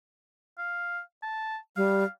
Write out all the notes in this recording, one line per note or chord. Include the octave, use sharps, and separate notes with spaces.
F5
A5
G3 F5